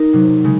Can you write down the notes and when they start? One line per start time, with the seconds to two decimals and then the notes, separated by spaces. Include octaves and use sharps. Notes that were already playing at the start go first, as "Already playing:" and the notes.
Already playing: D#4 A#4
0.13 C3 F#3
0.44 C#3 G#3